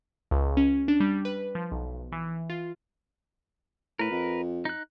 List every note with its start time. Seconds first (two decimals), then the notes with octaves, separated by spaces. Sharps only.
0.31 C#2
0.57 C#4
0.88 D4
1.00 G3
1.25 B4
1.55 F3
1.72 B1
2.12 E3
2.50 F4
3.99 A2 A#4 B4
4.11 F2
4.65 D#4 F#6